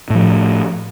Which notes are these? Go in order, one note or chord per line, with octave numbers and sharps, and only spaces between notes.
A2 F3